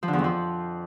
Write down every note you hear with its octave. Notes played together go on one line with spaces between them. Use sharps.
F3
D3
E2
F2
F3